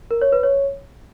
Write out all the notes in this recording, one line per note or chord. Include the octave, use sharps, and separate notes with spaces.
A#4
C#5
B4
C#5